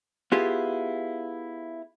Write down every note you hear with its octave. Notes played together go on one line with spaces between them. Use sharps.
B3 E4 F4 G4 G#4